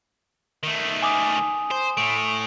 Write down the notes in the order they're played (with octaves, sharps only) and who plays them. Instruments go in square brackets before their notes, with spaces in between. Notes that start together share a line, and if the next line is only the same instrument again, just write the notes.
[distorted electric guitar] D#3 A3
[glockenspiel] G#5 D6 D#6
[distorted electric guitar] C5
[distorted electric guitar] A2 A3 [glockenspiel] D7